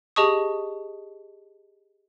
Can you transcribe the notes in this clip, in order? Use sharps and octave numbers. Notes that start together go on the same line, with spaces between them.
G4 G#4 D#5 A5 C#6 D#6